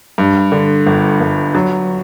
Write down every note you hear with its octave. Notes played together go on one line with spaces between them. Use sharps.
G2
D3
G1
G1
F#3